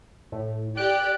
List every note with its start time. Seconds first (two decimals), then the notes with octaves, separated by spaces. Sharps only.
0.32 A2
0.77 G4 D5 F#6 D7